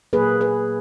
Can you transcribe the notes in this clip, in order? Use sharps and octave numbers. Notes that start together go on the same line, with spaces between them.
A#2 F#3 A#3 G#4 B4
G#4 B4